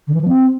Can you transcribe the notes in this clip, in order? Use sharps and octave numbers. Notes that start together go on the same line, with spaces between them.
D3
E3
F3
C4